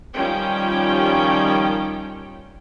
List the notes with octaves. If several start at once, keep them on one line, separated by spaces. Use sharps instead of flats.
D#3 F3 G3 C#4 G5